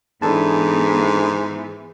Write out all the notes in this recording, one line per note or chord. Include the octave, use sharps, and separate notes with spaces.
G#2 E3 B3 D4 A4 A5